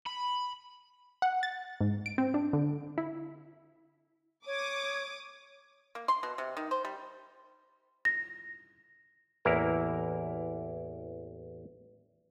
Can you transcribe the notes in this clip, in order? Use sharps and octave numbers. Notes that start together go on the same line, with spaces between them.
B5
F#5
A6
G#2
D7
C4
D4
D3
E4
C#5 D6 D#6
A#3
C6
B2
C3
D#3
C5
G3
A#6
A1 E2 A#3 E4 A#4 A#5